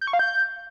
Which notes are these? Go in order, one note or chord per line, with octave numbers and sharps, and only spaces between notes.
G6
C#6
F5
G6